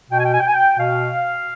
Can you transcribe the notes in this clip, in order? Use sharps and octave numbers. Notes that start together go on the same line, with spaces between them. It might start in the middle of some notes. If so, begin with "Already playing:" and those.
B2 G5
G#5
G5
G#5
G5
G#5
G5
B2 F5